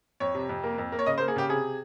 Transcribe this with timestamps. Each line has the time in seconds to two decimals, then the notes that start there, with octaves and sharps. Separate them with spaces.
0.20 F2 C#5
0.34 C3
0.49 F2
0.64 A#3
0.78 F2
0.92 A#3
0.99 C#5
1.06 C#3 D#5
1.18 C5
1.20 A#3
1.28 G#4
1.36 C#3 G4
1.49 C3 G#4